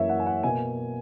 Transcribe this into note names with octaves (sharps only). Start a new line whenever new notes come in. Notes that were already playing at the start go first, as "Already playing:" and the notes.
Already playing: F#2 E3 A#3 C#5 E5
F#5
G#5
F#5
B2 A#3 G#5